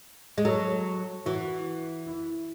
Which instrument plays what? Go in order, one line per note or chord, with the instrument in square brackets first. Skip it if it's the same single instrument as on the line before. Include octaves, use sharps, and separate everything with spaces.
[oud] G#3
[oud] F#3 [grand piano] A4
[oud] E3 [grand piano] F#4
[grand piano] E4